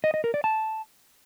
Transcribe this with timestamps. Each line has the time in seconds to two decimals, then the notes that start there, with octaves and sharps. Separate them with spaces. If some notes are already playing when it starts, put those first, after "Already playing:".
0.04 D#5
0.14 D#5
0.24 A#4
0.34 D5
0.44 A5